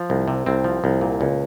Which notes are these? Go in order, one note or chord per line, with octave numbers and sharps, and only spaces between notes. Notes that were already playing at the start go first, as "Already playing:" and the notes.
Already playing: F3
C2
C3
C2 C4
F3
C2
A#2
C#2